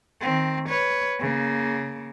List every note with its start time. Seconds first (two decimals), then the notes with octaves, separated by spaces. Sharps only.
0.21 D#3 C4
0.68 B4 C#5
1.20 C#3 A#3